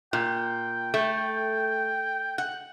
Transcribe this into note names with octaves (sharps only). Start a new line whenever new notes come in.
A#2 G5
A3
F#5